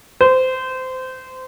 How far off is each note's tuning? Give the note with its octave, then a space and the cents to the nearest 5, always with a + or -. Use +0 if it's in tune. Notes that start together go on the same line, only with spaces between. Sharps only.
C5 -20